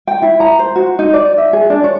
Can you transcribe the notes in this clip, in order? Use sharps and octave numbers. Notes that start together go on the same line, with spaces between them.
G5
E4
A#5
C5
F#4
D#4
D5
E5
G#4
D4
C#5